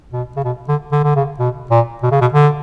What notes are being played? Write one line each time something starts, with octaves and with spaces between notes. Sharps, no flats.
B2
C#3
B2
D3
D3
D3
C#3
B2
A#2
B2
C#3
B2
D3